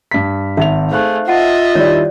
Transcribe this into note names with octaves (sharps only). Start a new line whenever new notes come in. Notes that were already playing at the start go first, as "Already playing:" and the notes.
G2 B6
G#1 D#4 E5 F7
A3 G#4 C5 F5 F#6
F4 D#5 E5 F#5 A5
D#3 G3 E4 C#5 D5